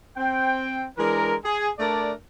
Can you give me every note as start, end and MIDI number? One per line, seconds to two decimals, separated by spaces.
0.17 0.86 60
0.17 0.86 79
0.98 1.34 52
0.98 1.34 56
0.98 1.34 62
0.98 1.34 70
1.45 1.69 68
1.79 2.12 57
1.79 2.12 62
1.79 2.12 70
1.79 2.12 74